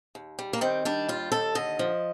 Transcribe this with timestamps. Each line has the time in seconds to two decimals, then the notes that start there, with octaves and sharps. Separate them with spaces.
0.15 D#2
0.39 G3
0.53 A#3
0.61 D#3 C4
0.85 G3 D4
1.09 D#2 F4
1.32 D#2 A4
1.55 D3 D#5
1.79 F3